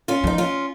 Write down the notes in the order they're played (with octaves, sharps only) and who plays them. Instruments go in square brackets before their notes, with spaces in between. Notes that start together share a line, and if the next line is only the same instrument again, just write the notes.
[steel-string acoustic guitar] C#4 F4
[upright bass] F3 [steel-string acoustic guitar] D#4
[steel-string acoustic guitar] C#4 F4